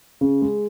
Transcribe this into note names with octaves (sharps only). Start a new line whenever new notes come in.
C#3
G#3